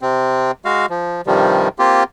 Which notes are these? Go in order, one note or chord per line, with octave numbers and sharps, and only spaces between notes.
C3 C4
G#3 F#4 F5
F3
G2 C3 D#3 F3 G3
A#3 C4 F4 G4